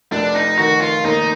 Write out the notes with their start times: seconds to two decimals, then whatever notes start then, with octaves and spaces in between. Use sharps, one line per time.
0.12 F1 D4
0.34 D#4
0.59 D#3 F#4
0.81 F4
1.04 D#2 D#4